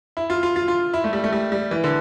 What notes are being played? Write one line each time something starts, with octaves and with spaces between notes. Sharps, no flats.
E4
F4
F4
F4
F4
E4
A3
G3
A3
G3
G3
E3
D3